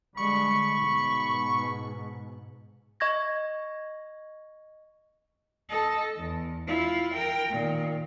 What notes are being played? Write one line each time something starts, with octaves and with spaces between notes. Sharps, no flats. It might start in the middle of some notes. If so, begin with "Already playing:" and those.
D3 G3 G#3 B5 C#6
G#2 B2
D#5 C#6 G#6 A#6
A4 D#5
E2
E4 F4
A#4 G5
A#2 D#3